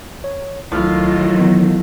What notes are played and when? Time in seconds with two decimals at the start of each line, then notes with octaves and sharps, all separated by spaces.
0.24 C#5
0.72 C2 A2 D#3 F#3 F4 F6
1.37 E3 B3